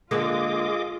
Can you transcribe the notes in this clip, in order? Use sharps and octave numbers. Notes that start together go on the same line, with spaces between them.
D3 G#3 A#3 F4 G#4 D#5 D6